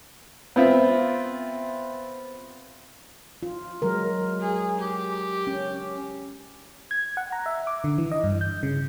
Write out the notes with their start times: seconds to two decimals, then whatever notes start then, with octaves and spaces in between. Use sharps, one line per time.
0.56 B3 C4 F4 E5
3.43 F4
3.82 F#3 G#3 A#4
4.41 G#4
4.79 G4
5.47 C#4
6.91 G#6
7.17 F#5
7.32 A#5
7.46 E5
7.67 D6
7.84 D3
7.98 E3
8.12 D#5
8.24 G2
8.41 G6
8.63 C#3